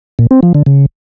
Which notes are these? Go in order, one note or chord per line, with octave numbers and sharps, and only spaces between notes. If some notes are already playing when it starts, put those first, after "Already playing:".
A#2
C4
F3
D3
C#3